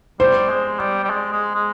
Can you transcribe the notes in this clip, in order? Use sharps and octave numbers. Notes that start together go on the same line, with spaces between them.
G3 C5
G#3
G3
G3
G#3
G#3
G#3